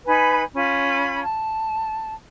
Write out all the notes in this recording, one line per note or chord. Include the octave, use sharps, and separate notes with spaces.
D#4 B4 G#5 B5
C#4 F4 B5
A5